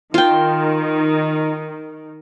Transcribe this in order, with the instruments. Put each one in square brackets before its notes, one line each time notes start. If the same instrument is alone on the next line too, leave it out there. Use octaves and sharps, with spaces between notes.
[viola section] D#3 [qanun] F4 G5